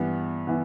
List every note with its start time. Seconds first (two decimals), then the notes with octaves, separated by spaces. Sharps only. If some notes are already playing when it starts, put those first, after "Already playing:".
Already playing: G2 E3 B3
0.47 E3 B3